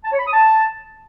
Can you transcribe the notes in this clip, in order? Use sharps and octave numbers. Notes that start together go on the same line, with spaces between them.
A5
C#5
B5
D#6
A5